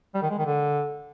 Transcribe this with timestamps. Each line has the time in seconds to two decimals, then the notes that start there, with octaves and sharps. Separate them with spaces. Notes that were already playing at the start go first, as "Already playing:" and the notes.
0.14 G3
0.22 D#3
0.30 G#3
0.38 D#3
0.46 D3